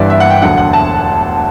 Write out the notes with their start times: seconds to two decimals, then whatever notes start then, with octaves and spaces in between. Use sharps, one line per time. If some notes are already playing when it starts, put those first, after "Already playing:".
Already playing: G1 G2 E3 G3 D5 E5
0.10 E5
0.20 F#5
0.30 G5
0.42 E1 D2 D3 F#3 F#5
0.58 F#5
0.73 A5